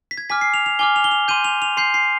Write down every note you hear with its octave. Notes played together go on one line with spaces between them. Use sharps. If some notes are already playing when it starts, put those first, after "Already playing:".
B6
G#6
G#5 D6 F6 B6
C7
F7
F7
G#5 D6 F6 G7
F7
G7
F7
C6 G6 D#7
F7
F7
C6 G6 C7
C7